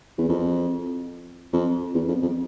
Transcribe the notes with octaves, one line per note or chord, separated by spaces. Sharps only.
E2
F2
F2
E2
F2
F2